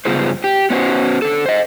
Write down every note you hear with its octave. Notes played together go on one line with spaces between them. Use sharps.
G2 C#3 B3 F4 G#4 C5
G4
B3 C#4 D4 F#4 C5
D3 A4
C5 D#5